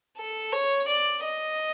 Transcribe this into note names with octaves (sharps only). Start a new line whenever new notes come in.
A4
C#5
D5
D#5